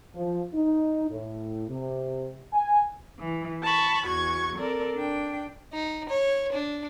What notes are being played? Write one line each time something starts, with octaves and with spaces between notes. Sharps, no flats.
F3
D#4
A2
C3
G#5
E3
A5 B5 C#6
E2 F#4 C#6 G#6
C4 A4 A#4 D5
D4 G5
D#4
C#5
D4